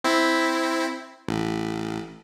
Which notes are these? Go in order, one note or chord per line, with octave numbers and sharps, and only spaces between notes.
C4 E4
A1